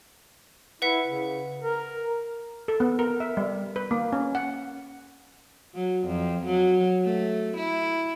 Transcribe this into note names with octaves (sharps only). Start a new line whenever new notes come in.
E4 B4 F#5 B6
C#3
A#4
A4
B3
A#4
E5
G3
B4
A#3
C#4
F#5
F#3
F2
F#3
A3
E4